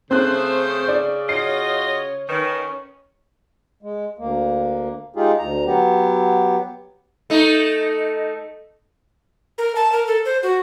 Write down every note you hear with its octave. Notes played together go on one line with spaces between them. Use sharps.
C#3 A3 C4 C5 D#6 F#6
D5
F4 F#4 C#5 D#5 C7
C#5
D#3 C#4 B4
G#3
D2 A#3
G#3 D#4 F4 G4 G#4
D2 A#5
F#3 B3 G4
A3 D#4
A#4
A5
A#4
A4
C5
F#4